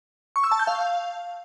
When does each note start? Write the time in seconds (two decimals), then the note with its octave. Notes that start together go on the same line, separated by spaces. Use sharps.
0.36 C#6
0.44 E6
0.52 A5
0.59 G6
0.67 F5